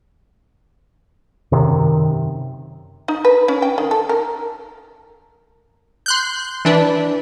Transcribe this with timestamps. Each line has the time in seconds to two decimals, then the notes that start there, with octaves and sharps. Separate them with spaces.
1.52 F#2 C3 D#3
3.08 D#4
3.25 B4
3.48 C#4
3.62 G5
3.78 D#3
3.91 A4
4.09 A#4
6.06 C6 F#6 G6
6.65 E3 D4 B4